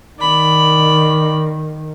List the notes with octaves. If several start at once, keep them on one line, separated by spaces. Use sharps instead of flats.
D#3 D5 B5